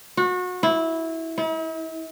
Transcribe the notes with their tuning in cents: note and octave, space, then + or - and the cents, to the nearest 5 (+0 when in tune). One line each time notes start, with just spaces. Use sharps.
F#4 -30
E4 -15
E4 -45